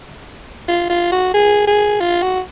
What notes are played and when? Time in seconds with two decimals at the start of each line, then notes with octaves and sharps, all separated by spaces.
0.68 F4
0.90 F4
1.12 F#4
1.34 G#4
1.67 G#4
2.00 F4
2.22 F#4